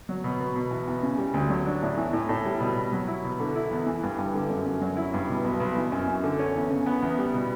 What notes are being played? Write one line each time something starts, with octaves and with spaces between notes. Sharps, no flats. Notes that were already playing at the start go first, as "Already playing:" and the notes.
F#3
B2
B2
B2
E2
E2
C#3
G3
D2
F#3
D4
A2
E3
A2
A2
G3
B2
B2
F#3
E4
B2
D3
E4
E2
E3
G2
G2
D3
F#2
F#2
F#3
E4
G2
B2
B1
B1
E3
F#2
F#2
D3
C#4
E2
C#3
B3
E2
G3
B2